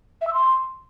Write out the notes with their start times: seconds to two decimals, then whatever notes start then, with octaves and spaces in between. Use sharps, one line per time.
0.21 E5
0.27 E6
0.33 C6